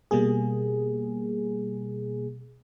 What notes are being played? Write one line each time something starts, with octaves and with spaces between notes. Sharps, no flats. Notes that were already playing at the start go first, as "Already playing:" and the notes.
B2 G3 A#3 G#4